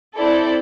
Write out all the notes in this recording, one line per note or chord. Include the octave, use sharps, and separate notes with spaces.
C4 E4 A4 D5